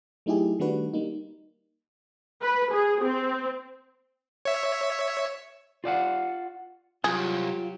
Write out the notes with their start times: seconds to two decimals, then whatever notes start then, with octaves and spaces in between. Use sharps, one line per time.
0.26 F#3 A3 D#4 E4 G4 G#4
0.59 D#3 G3 A3 D4 F#4 B4
0.94 G3 A#3 D#4
2.42 B4
2.72 G#4
3.03 C4
4.45 C#5 E5
5.84 F4 D5 F5 F#5
7.04 C2 F#3 F4 G4 G#4